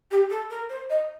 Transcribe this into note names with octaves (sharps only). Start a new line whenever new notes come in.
G4
A4
A#4
C5
D#5